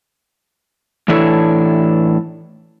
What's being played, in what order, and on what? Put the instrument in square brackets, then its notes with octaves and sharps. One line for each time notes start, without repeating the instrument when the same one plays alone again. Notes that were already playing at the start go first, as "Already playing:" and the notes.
[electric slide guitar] A2 E3 D4 E4 A4 C#5